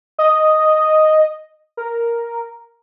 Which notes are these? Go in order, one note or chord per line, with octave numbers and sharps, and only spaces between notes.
D#5
A#4